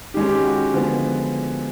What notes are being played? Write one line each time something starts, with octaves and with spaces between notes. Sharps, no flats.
D#3 G#3 C#4 G4
G4
F#4
D3 F3 G#3 B3